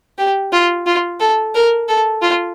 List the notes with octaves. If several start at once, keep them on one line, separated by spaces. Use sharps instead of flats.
G4
F4
F4
A4
A#4
A4
F4